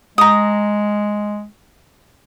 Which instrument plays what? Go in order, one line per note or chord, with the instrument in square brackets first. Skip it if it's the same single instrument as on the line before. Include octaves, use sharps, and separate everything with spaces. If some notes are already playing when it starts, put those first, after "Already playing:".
[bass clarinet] G#3 [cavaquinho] A#5 D#6